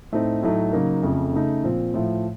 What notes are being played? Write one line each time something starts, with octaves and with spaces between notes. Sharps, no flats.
A2 A3 C4 D#4
A2 F#3 A3 D#4
C#3 F#3 A#3 D#4
F2 C#3 A3
C#3 A3 D#4
A#2 F3 C4
A2 F3 A3